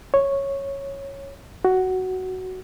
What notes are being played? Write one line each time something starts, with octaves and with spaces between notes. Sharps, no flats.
C#5
F#4